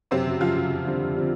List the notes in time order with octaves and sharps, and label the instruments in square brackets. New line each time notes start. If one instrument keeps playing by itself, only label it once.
[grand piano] F#2 [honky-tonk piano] C3 C4
[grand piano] C#3 F#3
[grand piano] F#2 [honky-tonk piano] F3 F4
[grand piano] C#3 F#3
F2
D3 G3 C4
F2
D3 G3 C4